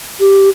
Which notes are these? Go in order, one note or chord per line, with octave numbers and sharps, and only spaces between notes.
G4